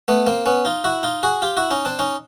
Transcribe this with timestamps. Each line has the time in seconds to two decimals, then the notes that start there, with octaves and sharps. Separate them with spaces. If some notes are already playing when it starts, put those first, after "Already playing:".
0.08 A3 B3
0.27 A#3 C4
0.46 B3 C#4
0.65 D#4 F4
0.84 E4 F#4
1.03 D#4 F4
1.23 F#4 G#4
1.42 F4 G4
1.57 E4 F#4
1.71 C#4 D#4
1.85 C4 D4
1.99 C#4 D#4